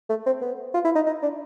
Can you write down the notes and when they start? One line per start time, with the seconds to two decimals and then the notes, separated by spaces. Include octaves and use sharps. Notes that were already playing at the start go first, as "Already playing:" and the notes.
0.10 A3
0.26 C4
0.42 B3
0.74 F4
0.85 E4
0.95 D#4
1.06 D#4
1.23 D4